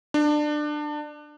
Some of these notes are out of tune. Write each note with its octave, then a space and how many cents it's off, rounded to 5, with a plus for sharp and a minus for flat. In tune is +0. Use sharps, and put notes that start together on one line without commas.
D4 +25